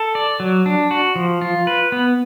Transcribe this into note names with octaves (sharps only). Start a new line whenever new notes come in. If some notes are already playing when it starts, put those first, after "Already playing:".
Already playing: A4
D5
F#3
D4
F#4
F3
F4
B4
B3